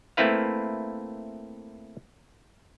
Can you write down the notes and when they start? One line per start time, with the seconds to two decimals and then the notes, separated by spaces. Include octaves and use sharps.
0.17 A3 A#3 C4 E4 B4 F5